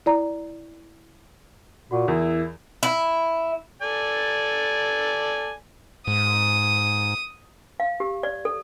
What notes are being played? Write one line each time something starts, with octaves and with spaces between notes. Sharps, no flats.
E4 D5 A#5
A#2 F#4 F#5 C#6
E2 E4 A#4
E4
A4 D5 G#5
G#2 D#6
F5
G4
D5
A4